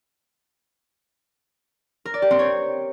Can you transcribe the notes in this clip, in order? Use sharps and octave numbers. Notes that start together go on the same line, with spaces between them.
A#4
D5
G4
C4
C#5